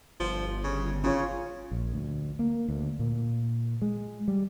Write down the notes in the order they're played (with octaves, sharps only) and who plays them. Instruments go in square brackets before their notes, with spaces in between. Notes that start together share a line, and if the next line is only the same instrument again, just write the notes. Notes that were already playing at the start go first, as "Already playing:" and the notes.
[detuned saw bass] G1 [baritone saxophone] F3
[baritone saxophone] C#3
[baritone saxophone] C#3 [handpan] C#4 F4 C#5
[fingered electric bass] A#1
D2
A#3
D2
A#2
G#3
G3